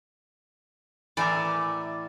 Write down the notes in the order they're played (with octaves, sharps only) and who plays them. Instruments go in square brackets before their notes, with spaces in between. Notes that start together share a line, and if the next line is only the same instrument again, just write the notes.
[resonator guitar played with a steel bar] A2 E3 G#5 [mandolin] A#4 E5 D6 [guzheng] D5